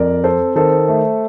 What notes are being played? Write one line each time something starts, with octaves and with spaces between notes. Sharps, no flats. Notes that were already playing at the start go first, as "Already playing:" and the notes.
Already playing: F2 A#4 D5
C4 A4 C5
D#3 A4 C5
A3